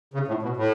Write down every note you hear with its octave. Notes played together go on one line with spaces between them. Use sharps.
C#3
A2
B2
A2